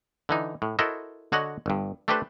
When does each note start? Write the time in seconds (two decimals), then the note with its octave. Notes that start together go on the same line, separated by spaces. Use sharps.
0.29 D3 E3 D#4
0.62 A2
0.79 E4 F#4 A4 A#4 C5 D#5
1.32 D3 F#4 C#5 D#5 F#5
1.66 G1 G2
2.08 A3 D4 G4 A4 B4 C5